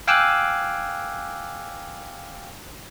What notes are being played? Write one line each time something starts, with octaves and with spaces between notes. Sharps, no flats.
F5 G5 G#5 D6 E6 F#6